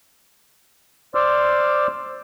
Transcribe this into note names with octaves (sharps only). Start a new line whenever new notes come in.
C5 D5 C6 D6 E6 F6